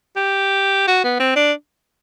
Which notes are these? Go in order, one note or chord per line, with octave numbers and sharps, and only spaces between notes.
G4
F#4
B3
C4
D4